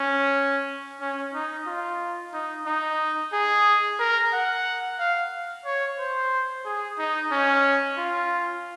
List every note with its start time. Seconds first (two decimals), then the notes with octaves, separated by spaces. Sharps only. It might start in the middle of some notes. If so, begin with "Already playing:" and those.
Already playing: C#4
1.00 C#4
1.34 D#4
1.66 F4
2.33 D#4
2.66 D#4
3.33 G#4
3.99 A#4
4.33 F#5
4.99 F5
5.65 C#5
5.98 C5
6.65 G#4
6.98 D#4
7.31 C#4
7.97 F4